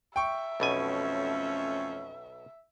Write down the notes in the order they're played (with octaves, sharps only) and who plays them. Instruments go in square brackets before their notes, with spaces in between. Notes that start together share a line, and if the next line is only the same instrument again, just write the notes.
[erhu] E5 [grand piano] G5 C#6
[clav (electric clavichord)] B1 B2 G#5 [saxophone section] F2 A3 C#4